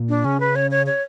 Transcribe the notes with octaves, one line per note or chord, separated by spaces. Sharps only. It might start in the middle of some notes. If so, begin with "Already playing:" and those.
Already playing: A#2
D4
C#3 C#4
B4
C#5
C#5
C#5